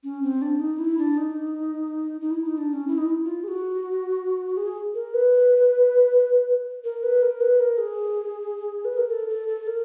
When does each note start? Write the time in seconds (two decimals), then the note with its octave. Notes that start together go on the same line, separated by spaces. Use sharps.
0.03 C#4
0.23 C4
0.42 D4
0.59 D#4
0.78 E4
0.98 D4
1.17 D#4
2.21 D#4
2.30 E4
2.45 D#4
2.58 D4
2.73 C#4
2.87 E4
2.98 D#4
3.05 E4
3.24 F4
3.43 G#4
3.48 F#4
4.57 G#4
4.94 A#4
5.13 B4
6.84 A#4
7.03 B4
7.22 A#4
7.40 B4
7.59 A#4
7.78 G#4
8.85 B4
8.97 A#4
9.10 A4
9.29 A4
9.48 A4
9.67 A#4